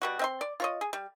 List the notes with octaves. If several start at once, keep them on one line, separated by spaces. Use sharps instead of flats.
B2 G3 F#4
C4 E5 C6
D5
F4 C#5 D#5
G#4
G3